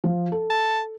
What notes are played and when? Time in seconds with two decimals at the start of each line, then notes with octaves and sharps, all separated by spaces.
0.04 F3
0.32 A4
0.50 A5